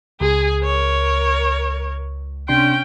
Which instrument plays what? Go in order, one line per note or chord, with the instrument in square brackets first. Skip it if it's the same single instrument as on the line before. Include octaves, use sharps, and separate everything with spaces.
[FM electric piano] C#2 [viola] G#4 G#5
[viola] A#4 C#5
[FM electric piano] C3 D4 C6 [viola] C#4 G5